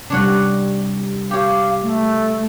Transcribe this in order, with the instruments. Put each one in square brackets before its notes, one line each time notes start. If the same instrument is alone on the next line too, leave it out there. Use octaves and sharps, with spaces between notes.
[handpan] C3 G3 [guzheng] D4 C#5 F#5
[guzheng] G4 C#5 [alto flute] F5
[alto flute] A3